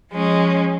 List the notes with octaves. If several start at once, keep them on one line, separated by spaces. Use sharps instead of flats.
F3 G#3 C#4